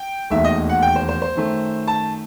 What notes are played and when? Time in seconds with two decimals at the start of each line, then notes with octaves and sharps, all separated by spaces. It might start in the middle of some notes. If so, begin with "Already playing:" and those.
Already playing: G5
0.30 E1 D#2 D#3 A3 E5
0.44 D#5
0.69 F#5
0.82 G5
0.96 C5
1.09 C5
1.22 C5
1.36 F#2 D#3 A3
1.87 A5